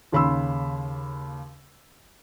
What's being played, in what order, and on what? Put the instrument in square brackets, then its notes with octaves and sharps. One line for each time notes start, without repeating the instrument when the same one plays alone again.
[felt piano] D#2 C#3 B5 C6 E6